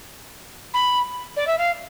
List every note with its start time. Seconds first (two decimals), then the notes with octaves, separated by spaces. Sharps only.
0.74 B5
1.36 D5
1.47 E5
1.58 F5